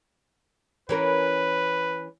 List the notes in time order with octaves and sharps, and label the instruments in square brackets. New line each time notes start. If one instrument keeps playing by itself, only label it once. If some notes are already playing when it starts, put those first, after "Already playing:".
[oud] E3 C#4 A#4 [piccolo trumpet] B4